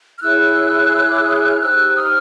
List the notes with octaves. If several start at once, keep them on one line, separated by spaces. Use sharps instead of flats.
F6
E4 G#4 C#5 E6 F#6
D6
D#6
E6
F6
D#4 G4 C5 E6 F#6
F#6
D#6 F6